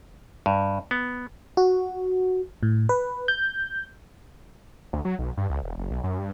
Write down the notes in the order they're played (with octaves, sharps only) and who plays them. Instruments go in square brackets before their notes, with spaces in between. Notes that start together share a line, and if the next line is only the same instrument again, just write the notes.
[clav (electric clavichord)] G2
B3
[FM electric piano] F#4
A2
B4
G6
[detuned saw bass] D2
F#3
B1
G2
C#2
E1
F#1
B1
F#2
G2